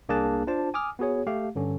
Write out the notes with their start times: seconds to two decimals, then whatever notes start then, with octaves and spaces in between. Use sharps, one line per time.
0.09 C2 A#3 D4 G#4 A5 F#6
0.47 D4 F4 C5 A5
0.74 G#5 D6 D#6 F6
0.99 B3 F#4 G#4 C#5
1.27 A3 G4 F5
1.55 G2 D3 C#4